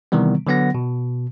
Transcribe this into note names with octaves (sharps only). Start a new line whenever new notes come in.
C3 D#3 E3 G3 B3
D3 F#3 B3 F#5 A#6
B2